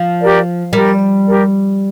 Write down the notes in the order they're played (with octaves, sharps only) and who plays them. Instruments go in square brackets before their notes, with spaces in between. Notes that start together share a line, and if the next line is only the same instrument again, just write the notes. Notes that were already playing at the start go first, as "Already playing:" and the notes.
Already playing: [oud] F3
[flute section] G4 A#4 D5
[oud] G3 [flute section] G4 A#4 D5
[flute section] G4 A#4 D5